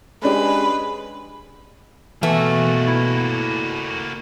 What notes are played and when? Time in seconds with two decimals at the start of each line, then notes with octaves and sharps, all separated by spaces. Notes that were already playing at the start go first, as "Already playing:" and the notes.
0.23 G#3 C#4 D4 G4 B4
2.23 B2 E3 A3 A#3 F#4
2.87 E4